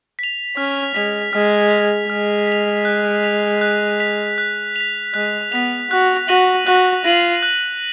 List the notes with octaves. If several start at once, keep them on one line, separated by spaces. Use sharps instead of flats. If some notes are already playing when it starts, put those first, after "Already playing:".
B6 F7
C#4 F6
G#3 B6 F7
G#3 F6
B6 F7
G#3 F6
B6 F7
F#6
B6 F7
F#6
B6 F7
F#6
B6 F7
G#3 F#6
B3 B6 F7
F#4 F#6
F#4 A#6 D#7 F#7
F#4 F#6
F4 A#6 D#7 F#7
F#6